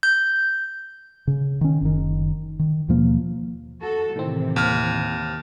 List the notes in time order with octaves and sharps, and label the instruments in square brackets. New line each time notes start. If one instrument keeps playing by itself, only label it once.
[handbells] G6
[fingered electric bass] C#3
D#3 C#4
F#1 D#3
D#3
D#2 B2 F3 A#3
[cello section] F#4 A4
[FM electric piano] A2 D#3 C4 [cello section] C3 E3
[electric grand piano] D#2 F6